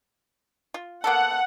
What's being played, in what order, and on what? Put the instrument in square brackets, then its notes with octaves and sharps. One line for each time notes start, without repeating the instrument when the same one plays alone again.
[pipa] F4
[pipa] A#3 B3 A4 [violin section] F#5